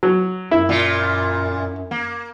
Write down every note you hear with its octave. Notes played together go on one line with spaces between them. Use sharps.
F#3
F#2 E4
A#2 F4
A#3